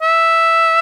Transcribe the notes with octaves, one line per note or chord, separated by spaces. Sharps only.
E5